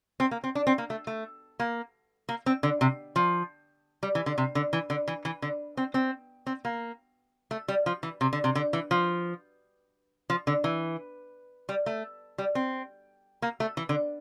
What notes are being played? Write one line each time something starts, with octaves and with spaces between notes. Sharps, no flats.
C4
A#3
C4
D4
C4
A#3
A3
A3
A#3
A#3
C4
D3
C3
F3
G3
E3
D3
C3
D3
E3
D3
E3
E3
D3
C4
C4
C4
A#3
A3
G3
F3
E3
C3
D3
C3
D3
E3
F3
F3
D3
E3
G3
A3
G3
C4
A#3
A3
E3
D3